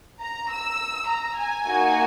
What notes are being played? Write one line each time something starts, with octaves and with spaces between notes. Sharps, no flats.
A#5
E6
A#5
G#5
A#3 D#4 F#4